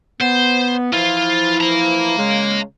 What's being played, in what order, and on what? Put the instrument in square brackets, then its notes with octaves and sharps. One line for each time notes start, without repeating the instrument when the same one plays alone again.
[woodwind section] B3 [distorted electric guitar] C5
[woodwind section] E3 F3 E4 [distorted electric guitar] F4 F5
[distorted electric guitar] F5 A#5
[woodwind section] C#3 G#3